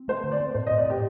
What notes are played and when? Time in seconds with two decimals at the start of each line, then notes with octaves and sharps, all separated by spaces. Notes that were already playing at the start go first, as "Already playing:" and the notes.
Already playing: C4
0.08 A3 C5
0.24 D3
0.32 D5
0.40 C4
0.54 A2 C5
0.67 D#5
0.71 A2
0.78 D5
0.86 A2 G4